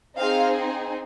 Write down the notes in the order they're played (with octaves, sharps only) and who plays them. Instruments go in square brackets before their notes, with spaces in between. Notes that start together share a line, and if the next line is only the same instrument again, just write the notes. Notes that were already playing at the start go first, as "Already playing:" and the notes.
[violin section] C4 D#4 G#4 F5